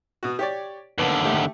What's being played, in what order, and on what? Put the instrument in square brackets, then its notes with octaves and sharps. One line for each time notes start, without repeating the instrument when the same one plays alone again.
[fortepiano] B2 F#4
G4 C#5 D5
[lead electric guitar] D#2 D3 [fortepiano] B3
[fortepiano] A3 G4